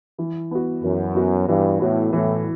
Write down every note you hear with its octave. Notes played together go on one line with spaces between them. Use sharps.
E3
B3 F#4
F#2 E3
B3 F#4
G2 E3
A2 B3 F#4
A2 E3